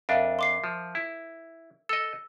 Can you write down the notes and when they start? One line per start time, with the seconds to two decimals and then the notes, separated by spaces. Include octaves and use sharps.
0.09 F2 D4 A#4 E5 F5
0.39 C6 D6 C7
0.64 F3
0.95 E4
1.89 A4 D#5 E6